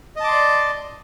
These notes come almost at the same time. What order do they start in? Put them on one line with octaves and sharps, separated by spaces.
D#5 A5 D6 C6 D5